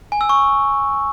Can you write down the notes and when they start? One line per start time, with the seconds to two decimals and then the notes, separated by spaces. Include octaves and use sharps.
0.12 G#5
0.21 E6
0.29 C#6